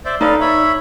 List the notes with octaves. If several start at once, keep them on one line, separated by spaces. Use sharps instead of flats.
C5 D5 E5
D#4 A4 B4 D5 F5
C#5 E5 B5